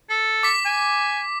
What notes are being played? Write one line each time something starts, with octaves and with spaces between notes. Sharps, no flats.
A4
D6 B6
G#5